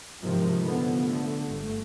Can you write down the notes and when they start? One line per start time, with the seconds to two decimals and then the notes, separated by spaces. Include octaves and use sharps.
0.21 G#2 C3 D#3 F3
0.59 D3 F3 A3 B3
1.04 D3 A3
1.47 G1 A3